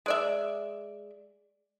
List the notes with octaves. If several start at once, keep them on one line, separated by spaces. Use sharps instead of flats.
G#3 D5 E5